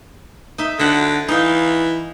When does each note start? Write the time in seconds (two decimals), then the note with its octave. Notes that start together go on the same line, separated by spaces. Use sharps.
0.58 D#4 E5
0.79 D3 E5 F#5
1.28 E3 D#4 F5